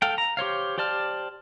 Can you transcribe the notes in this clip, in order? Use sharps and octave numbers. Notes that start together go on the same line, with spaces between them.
A4 F5 G5
A#5
G4 C5 C#5 F5
G4 C5 D5 A5 F6